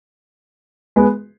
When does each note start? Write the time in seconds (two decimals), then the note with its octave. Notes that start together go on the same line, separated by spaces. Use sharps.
0.96 G#3 B3